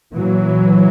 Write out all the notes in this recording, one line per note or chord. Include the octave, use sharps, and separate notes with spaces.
A#2 E3 F#3